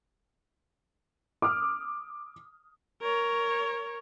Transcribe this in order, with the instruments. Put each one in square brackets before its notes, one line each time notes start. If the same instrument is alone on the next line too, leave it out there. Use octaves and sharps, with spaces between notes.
[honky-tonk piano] D6 D#6 F6
[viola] A#4 C#5